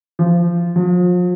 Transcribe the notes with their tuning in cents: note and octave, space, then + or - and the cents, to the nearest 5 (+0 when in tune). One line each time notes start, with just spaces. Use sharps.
F3 -20
F3 +40